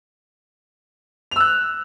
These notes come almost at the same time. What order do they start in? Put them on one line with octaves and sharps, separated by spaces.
F7 E6 F#6